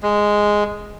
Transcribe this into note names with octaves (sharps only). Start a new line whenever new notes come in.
G#3